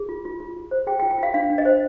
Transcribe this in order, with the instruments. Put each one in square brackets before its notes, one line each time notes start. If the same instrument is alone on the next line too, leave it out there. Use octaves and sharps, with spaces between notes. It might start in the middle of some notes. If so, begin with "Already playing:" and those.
Already playing: [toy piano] G#4
F4
F4
F4
F4
C5
G#4 G5
G5
F4
G5
F4 F5
D4 F5
D4
D#5
C5